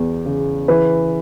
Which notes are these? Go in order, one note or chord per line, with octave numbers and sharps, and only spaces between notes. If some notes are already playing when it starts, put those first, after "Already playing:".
Already playing: E2
C#3
E3 B4